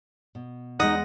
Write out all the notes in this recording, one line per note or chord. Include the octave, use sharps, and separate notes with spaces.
B2
E2 G#3 D#4 D#5 F#5